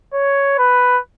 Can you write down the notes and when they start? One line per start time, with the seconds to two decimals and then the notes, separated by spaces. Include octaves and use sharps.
0.14 C#5
0.58 B4